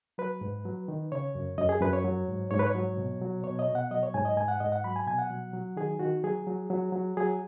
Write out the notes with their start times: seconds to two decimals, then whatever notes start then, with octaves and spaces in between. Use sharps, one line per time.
0.18 F#3 B4
0.41 G#2
0.65 F#3
0.88 D#3
1.12 C#3 C#5
1.35 F#2
1.58 F#2 D#5
1.69 G#4
1.81 F#2 B4
1.93 C#5
2.04 F#3
2.28 G#2
2.51 G#2 C#5
2.59 B4
2.66 C#5
2.75 F#3
2.97 B2
3.21 F#3
3.44 B2 C#5
3.59 D#5
3.68 B2
3.75 F#5
3.91 F#3 D#5
4.03 C#5
4.14 G#2 G#5
4.25 D#5
4.37 G#2 G#5
4.48 F#5
4.60 G#2 D#5
4.72 F#5
4.84 F#3 B5
4.96 G#5
5.07 B2 G#5
5.18 F#5
5.30 F#3
5.54 F#3
5.77 D#3 G#4
5.99 D#3 F#4
6.24 F#3 G#4
6.47 F#3
6.70 F#3
6.93 F#3
7.17 F#3 G#4